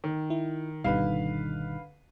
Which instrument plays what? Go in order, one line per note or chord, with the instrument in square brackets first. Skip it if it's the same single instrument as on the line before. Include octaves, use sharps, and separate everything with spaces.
[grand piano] D#3
[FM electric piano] E4
[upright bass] G#1 D#3 [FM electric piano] B2 G3 D#4 [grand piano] D3 B4 F5